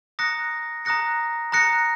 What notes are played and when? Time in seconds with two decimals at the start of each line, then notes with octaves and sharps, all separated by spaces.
0.19 A#5 D#6 F#6 A#6 C#7
0.85 A#5 D#6 F#6 A#6 C#7
1.52 A#5 D#6 F#6 A#6 C#7